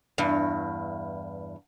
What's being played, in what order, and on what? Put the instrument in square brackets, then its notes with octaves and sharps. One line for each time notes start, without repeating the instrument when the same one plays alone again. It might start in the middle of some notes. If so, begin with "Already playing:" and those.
[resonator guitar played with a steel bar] E2 G2